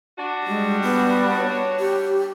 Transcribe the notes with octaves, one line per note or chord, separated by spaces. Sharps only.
D4 F#4
G3 G#3
B3
C#5
G4